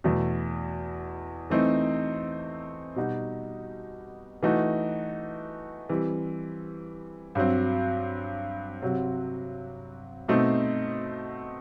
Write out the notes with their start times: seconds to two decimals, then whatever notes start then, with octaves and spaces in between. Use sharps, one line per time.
0.04 E2 B2 A3
1.50 E3 A3 C4 D#4
2.96 B2 G3 D#4 F#4
4.43 E3 A3 D#4 F#4
5.89 E3 G3 C4
7.35 G2 F#3 C4
8.82 C3 F#3 C4 F#4
10.28 B2 A3 C4 D#4